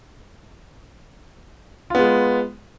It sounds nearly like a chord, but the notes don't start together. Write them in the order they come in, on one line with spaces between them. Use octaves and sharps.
F4 B3 G#3